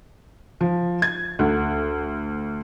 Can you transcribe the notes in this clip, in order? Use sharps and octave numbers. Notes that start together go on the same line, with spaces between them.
F3
G#6
D2